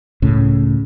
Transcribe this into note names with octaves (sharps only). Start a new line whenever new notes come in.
C#2 A2 C#3